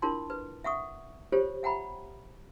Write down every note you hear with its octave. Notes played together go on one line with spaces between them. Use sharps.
D4 E4 F4 A#4 A5 C6
B4
E5 F#5 C#6 D#6
F4 G4 A4 C5 C#5
E5 F#5 G5 A#5 B5